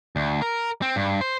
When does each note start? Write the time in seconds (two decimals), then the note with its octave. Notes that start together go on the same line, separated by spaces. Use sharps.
0.16 D2
0.42 A#4
0.82 C4
0.96 G2
1.21 C5